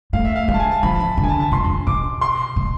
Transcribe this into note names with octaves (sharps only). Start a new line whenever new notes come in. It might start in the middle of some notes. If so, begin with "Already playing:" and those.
A3 F5
E5
F5
G#3 F5
A5
G#5
A5
F3 B5
A5
B5
D3
G#5
A5
A5
B2 C6
F2
B2 D6
C6
B2